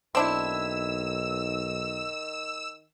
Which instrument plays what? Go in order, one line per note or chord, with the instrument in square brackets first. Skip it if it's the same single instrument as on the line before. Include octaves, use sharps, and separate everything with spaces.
[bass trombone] B1 [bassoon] D#3 [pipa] C4 D4 E4 [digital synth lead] E6